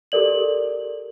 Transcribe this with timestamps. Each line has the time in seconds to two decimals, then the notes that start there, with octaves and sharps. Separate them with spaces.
0.12 G4 A4 A#4 D5 F#7